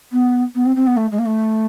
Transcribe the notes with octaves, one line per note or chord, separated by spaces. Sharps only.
B3
B3
C4
C4
B3
A3
G#3
A#3
A3